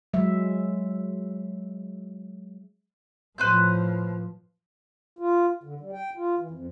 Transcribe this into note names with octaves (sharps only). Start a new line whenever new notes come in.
F#3 G#3 E5
A2 F3 B4 C5 G6
F4
D3
G3
G5
F4
E3
F2